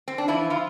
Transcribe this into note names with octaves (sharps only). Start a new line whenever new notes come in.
C4
D4
E3 F3 E4
F3 F4